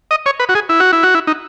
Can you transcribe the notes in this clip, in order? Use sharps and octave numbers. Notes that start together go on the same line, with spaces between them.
D#5
C#5
B4
F#4
G#4
E4
F#4
E4
F#4
E4
D#4